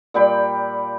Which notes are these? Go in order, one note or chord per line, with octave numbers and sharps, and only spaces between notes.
A#2 G3 G5 B5